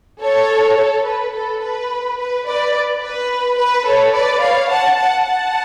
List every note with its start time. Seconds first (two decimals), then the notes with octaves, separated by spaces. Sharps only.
0.21 A4 C#5
0.77 A4
1.06 B4
1.33 A4
1.62 B4
2.18 B4
2.46 B4 D5
3.01 B4
3.57 B4
3.86 A4 C#5
4.14 B4 D5
4.42 C#5 F5
4.70 F#5 A5
4.99 F#5 A5
5.27 F#5 A5